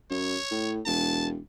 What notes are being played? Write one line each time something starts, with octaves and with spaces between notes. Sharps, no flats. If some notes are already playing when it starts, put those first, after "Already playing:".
F#2 C#5
A2
E1 A5